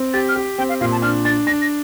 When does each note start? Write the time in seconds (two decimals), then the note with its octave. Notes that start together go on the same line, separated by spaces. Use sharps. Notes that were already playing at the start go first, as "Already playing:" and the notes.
Already playing: C4
0.13 G4 A6
0.29 F6
0.36 G4
0.58 C4 G5
0.69 F5
0.80 A#2 F5
0.92 A5
1.02 D4 F6
1.25 D4 A6
1.47 D4 A#6
1.62 A#6